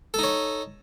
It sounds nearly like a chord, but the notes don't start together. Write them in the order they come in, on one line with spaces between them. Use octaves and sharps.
A4 D#4 C#5